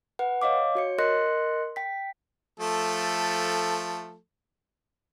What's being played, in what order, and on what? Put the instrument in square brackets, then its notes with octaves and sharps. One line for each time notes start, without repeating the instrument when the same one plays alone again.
[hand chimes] B4 F#5
C#5 D#5 F5 D6
F#4 C#5 C#7
A#4 D#5 C6 F#6 A#6 C#7
G5 B6
[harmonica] F3 A3 A4